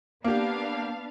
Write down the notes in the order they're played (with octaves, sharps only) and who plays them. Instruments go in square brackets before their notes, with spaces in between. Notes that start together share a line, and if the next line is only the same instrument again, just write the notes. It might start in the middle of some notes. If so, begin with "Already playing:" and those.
[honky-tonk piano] A#3 G4 [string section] B3 D4 F5